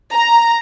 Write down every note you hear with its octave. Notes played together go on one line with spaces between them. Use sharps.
A#5